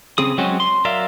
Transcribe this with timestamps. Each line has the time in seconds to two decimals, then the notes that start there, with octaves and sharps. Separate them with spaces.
0.18 C#3 C4 G#4 D#6
0.38 F#3 G#3 C4 C#4 F#4
0.60 C6
0.85 F#3 A#4 D5 E5 F5